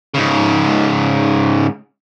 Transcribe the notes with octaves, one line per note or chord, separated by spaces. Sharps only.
G#2 C#3